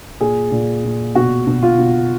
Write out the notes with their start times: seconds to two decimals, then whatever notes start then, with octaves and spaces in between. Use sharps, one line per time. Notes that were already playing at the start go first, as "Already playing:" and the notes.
0.20 A#2 G#4
0.51 A#2
0.84 A#2
1.15 B2 F#4
1.47 B2
1.63 F4
1.78 B2